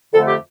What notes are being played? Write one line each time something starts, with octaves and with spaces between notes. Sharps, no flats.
F2 D3 A3 A4
G4